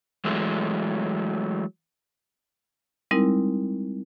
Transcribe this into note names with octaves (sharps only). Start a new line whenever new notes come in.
E3 F#3 G#3 A3
G3 G#3 C4 D#4 E4 A#4